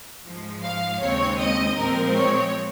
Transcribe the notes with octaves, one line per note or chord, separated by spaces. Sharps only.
G#2 F3 G#3
F5
D#2 C#3 G#3 C4 C#5
D#5
A#2 F3 G#3 C4 A#4
C#5